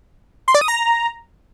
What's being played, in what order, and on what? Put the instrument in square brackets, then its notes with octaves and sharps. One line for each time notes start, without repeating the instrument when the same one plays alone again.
[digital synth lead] C6
D5
D#6
A#5